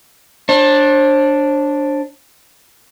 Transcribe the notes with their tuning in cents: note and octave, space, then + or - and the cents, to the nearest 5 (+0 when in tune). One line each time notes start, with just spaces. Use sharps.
D4 +0 C5 +45